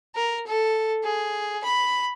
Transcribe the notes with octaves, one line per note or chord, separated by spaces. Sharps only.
A#4
A4
G#4
B5